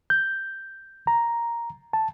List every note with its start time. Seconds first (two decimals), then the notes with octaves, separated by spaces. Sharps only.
0.10 G6
1.07 A#5
1.93 A5